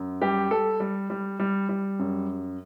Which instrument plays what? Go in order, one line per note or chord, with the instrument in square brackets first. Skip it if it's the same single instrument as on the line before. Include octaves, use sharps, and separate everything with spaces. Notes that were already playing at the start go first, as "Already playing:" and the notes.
Already playing: [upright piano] F#2
[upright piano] G3 [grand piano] G4
[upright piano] G3 [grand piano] A4
[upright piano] G3
G3
G3
G3
F#2